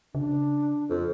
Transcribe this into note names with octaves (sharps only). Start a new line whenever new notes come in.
C#3 D4
F2